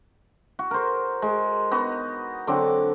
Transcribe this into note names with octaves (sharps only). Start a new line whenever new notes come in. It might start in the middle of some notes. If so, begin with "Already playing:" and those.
F#4
A#4 C5
G#3
B3 D#4 F#4
D3 F#3 C4 D6